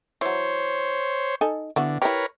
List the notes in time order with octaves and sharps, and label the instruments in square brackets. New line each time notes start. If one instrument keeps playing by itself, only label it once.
[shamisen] E3 F#3 [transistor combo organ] C5 C#5
[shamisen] D#4 A4 G#5
[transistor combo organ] D3 [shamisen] E3 B3 F#4
[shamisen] E4 G4 [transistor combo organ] A#4 B4 C#5